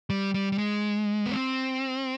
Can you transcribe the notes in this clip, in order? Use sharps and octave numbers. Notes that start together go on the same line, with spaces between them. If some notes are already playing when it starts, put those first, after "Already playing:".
G3
G3
G3
G#3
B3
C4